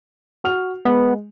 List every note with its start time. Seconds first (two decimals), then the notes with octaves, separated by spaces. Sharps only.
0.44 F#4 F6 F7
0.85 G#3 B3